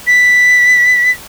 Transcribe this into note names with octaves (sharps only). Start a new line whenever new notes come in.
B6